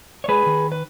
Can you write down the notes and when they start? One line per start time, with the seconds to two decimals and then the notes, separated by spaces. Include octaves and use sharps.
0.24 C#5
0.28 G#3 G#4 B4
0.46 D#3
0.72 B4